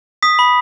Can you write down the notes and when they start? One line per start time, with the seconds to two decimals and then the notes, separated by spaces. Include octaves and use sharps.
0.23 D#6 B6
0.39 B5